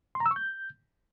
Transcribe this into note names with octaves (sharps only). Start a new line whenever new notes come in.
C6
A#5
E6
C#6
G6